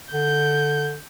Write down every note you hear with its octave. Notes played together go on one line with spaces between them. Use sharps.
D3 G6